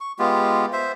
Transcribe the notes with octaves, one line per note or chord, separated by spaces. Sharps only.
C#6
G#3 B3 F4 G4
C5 E5